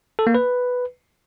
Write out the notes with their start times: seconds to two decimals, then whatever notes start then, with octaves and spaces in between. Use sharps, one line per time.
0.19 A4
0.27 A#3
0.35 B4